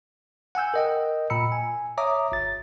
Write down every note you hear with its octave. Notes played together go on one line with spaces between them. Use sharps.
F#5 G#5 E6 G6
A#4 D#5 G5
A#2 A#5 B5 E6 C#7
G#5
C#5 E5 A#5 D6 D#6
G1 A6